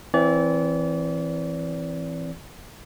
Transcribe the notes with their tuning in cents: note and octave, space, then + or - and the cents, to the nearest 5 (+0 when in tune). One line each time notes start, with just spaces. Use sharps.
E3 +5 C4 +0 D5 -35